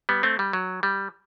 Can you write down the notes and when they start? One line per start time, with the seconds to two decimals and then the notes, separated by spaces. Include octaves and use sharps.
0.09 G3 B3
0.23 A3 C4
0.39 G3
0.53 F#3
0.83 G3